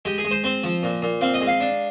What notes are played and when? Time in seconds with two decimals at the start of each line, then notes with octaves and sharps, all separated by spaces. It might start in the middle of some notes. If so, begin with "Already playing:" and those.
0.05 G#3 G4
0.18 G#4
0.24 G#3
0.31 C5
0.44 C4 C5
0.63 F3
0.83 A#2
1.02 A#2
1.21 C4 F5
1.34 D#5
1.41 G#3
1.47 F5
1.60 D4